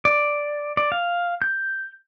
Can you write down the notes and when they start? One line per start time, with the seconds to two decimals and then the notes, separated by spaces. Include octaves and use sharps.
0.05 D5
0.77 D5
0.92 F5
1.42 G6